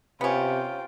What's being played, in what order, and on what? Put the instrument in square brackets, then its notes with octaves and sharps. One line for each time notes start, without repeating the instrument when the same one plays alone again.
[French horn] C3 [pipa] B3 C#4 [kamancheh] F4 G5